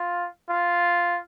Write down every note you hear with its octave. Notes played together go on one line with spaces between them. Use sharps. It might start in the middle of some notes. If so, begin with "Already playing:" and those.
Already playing: F4
F4